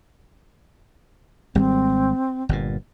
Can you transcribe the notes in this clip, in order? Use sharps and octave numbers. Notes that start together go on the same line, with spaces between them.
G#1 G3 G#3 C4
G1 G2 A#2